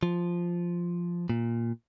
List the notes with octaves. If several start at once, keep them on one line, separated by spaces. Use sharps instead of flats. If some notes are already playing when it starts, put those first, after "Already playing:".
F3
A#2